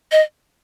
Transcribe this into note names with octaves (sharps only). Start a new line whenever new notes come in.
D#5